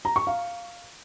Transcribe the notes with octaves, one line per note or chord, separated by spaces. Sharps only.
A#5
C#6
F5